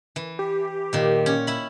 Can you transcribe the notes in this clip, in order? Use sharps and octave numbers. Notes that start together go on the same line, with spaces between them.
E3
G4
A#2 D#3
C#4
E4 B5